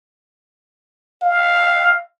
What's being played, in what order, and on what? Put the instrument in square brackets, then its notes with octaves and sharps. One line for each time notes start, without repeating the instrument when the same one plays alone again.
[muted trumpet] F5